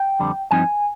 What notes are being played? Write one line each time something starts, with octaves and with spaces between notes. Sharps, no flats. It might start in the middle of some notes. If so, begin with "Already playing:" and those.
Already playing: G5
F2 D3 G3
G2 F3 C4 D#4 G#5